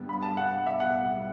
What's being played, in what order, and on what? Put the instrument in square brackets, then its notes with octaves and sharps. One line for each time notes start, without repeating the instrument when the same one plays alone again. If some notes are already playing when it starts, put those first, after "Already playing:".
Already playing: [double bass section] G2 D3 G3 B3
[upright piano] B5
A5
F#5
[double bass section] B1 A2 G3 B3 [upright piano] E5
[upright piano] F#5